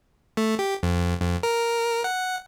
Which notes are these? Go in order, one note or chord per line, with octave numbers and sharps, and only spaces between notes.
A3
G4
F2
F2
A#4
F#5